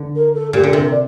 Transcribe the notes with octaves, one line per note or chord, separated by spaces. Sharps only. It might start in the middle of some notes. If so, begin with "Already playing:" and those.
Already playing: D3
A#4
A4
A#2 G4
D3 A4
C3
A#4
D5